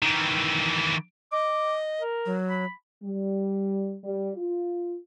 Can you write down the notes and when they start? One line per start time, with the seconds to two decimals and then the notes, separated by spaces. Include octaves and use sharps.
0.02 D#3 E3
1.32 D#5 D6
2.01 A#4
2.26 F#3
2.48 B5
3.03 G3
4.04 G3
4.36 F4